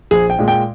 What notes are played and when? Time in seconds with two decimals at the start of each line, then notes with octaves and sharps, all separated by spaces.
0.11 A#1 G#4
0.30 G5
0.39 A#2 G#3
0.48 G5